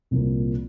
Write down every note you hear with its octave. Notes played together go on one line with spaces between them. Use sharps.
C2 A#2 F3 A#3